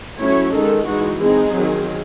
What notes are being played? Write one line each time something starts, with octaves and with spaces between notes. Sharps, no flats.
F#3 A3 C#4 E4 C#5
D#3 G#3 D#4 A4
E3 G#3 D#4 F#4
G#3 C4 D#4 G#4
D#3 F#3 C4